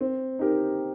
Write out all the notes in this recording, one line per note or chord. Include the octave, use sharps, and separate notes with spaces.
C4
D#4 G4 A#4